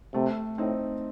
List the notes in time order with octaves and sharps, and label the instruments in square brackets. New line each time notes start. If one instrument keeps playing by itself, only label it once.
[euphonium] C3 [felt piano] A3
[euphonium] A2 [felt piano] C4 D#4